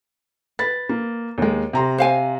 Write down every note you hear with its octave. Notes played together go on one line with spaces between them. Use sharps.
B4 A6
A#3
D#2 G#3
C3 A#5 C6
C5 F5 G#5